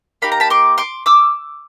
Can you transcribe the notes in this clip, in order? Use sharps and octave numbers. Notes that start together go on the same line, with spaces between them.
A#3 D#4 G4 B5
A#5
A5 B5
C6 D6
C6 D6
D6 E6